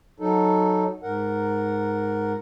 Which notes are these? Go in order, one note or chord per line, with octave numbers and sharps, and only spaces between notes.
F#3 D#4 A4
G#2 A#4 F#5